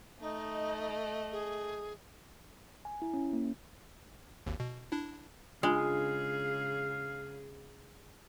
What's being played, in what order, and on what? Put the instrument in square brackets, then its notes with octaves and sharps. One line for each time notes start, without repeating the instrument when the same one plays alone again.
[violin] A3 D#5 [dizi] D#4
[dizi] G#4
[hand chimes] G#5
E4
C#4
A#3
[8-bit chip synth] G#1 D#2
B2
D4 E4
[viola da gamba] C#3 G#4 [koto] G#3 [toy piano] D4 F4 [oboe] F5